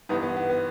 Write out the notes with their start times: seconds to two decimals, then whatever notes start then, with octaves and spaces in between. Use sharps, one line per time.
0.09 G1 G2 E3 B3 D#4
0.23 B3
0.36 B3
0.50 B3